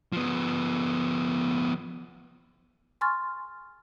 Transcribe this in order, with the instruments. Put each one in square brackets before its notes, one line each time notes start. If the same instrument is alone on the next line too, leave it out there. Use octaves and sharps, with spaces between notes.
[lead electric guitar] F3 B3
[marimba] G#5 C6 C#6 F6 A6